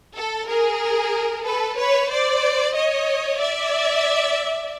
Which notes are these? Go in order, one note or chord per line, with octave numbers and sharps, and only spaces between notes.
A4
G#4 A#4
A4 B4
B4 C#5
C5 D5
C#5 D#5
D5 E5